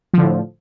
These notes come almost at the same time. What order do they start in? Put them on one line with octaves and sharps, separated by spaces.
F3 D3 A2